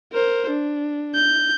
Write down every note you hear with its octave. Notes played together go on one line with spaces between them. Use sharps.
A#4 C5
D4
G6